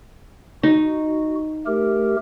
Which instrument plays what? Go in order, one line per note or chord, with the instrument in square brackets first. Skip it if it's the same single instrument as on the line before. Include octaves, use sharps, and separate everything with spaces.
[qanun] D#4 [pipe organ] F#4
[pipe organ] A3 G4 A#4